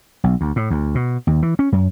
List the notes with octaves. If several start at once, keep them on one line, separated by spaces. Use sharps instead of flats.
B1
D2
A2
D2
B2
D#2
E3
C#4
F#2